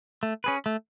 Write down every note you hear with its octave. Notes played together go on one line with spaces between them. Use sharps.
A3
C#4 G#4 B4
A3